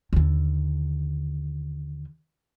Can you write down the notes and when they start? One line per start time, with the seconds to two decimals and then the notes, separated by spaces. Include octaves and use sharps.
0.13 D#2 D3